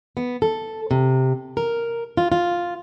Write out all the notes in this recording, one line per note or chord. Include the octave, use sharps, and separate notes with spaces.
B3
A4
C3
A#4
F4
F4